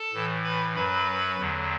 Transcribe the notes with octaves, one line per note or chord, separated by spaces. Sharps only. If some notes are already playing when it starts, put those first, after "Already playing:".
Already playing: A4 A5
A2 E3
B4 B5
F#2 F#3 B4 B5
E2 D3 F#3